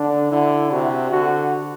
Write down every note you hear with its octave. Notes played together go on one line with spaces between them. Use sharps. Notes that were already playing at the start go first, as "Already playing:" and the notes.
Already playing: D3 D4
D3 E4
C3 F#4
D3 F#4